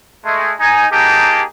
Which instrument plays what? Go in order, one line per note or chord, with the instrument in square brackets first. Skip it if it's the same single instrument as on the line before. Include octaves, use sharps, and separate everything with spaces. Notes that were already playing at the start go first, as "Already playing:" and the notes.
[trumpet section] G#3 A3
D#4 G#5
A#3 D#4 G4 G#4 A5